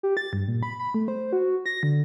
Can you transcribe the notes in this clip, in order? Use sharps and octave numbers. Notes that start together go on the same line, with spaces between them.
G4
A6
G2
A#2
B5
B5
A3
C5
F#4
A#6
D3